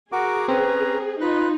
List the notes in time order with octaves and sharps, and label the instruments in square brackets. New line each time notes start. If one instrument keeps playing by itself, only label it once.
[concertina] F#4 A#4 D6 [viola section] G#4 [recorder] F#5
[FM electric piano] C4 [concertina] C#4 A#5 [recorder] B4
[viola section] D#4 [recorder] F4 [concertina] B4 F#6